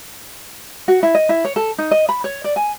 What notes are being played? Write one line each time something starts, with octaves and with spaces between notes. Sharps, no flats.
F#4
E4
D#5
E4
C#5
A4
D#4
D#5
B5
C#5
D5
G#5